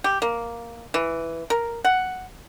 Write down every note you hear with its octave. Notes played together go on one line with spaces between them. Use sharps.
G4
A#3
E3
A#4
F#5